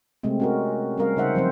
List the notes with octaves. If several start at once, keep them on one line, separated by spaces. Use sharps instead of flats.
C3 G#3 A3 C4
C#4 F#4 A#4
G3 C4 C#4 A#4 F5
C#3 D#4 C5 E5 F#5
F3 F#3 C4 C5